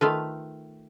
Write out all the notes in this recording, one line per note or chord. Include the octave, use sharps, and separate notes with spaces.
D#3 A3 F4 B4